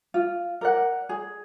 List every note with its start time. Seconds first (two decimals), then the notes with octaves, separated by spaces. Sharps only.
0.14 F4
0.61 A#4 D5 F#5
1.09 G#4